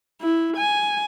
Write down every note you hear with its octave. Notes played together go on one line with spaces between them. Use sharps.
E4
G#5